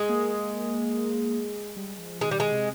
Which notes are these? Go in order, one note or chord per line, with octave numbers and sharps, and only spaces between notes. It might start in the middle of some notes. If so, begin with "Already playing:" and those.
Already playing: G#3
A#3
G3
F3
D#3 G#3
G3
G#3
C3